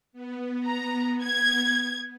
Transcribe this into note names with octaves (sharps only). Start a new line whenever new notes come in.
B3
A#5
G#6